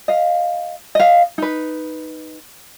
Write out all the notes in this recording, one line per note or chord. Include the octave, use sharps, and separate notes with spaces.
D#5 F5
D#5 F5
D#4 B4